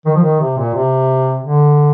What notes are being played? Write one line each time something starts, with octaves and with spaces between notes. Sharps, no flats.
D#3
F3
D#3
C3
A#2
C3
D3